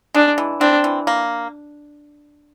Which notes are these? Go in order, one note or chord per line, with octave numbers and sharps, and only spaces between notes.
G#3 D4
E3
C4 D4
E3
A#3